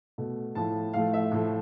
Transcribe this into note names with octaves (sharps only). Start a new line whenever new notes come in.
B2 A3
A2 F3 A3 A5
A2 F3 A3 F5
E5
A2 F3 A3